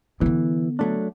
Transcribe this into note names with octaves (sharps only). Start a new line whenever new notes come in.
D3 E3 B3
F#3 A3 D4